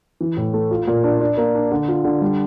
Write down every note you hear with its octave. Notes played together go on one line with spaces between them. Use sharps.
E3
A2
A3
F4
A#2
D4
D4
A#3
D4
D3
F4
D3
G3